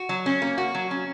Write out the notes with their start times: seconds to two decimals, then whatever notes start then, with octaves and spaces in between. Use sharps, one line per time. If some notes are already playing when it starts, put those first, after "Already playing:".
Already playing: F#4
0.09 F#3
0.26 C#4
0.42 A#3
0.58 F#4
0.75 F#3
0.91 C#4